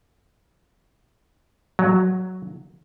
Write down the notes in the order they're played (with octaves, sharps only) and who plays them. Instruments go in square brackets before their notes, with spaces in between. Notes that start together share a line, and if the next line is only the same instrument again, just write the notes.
[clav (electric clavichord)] F#3